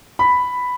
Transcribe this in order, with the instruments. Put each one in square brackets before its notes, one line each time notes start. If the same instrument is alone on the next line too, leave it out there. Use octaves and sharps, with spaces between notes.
[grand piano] B5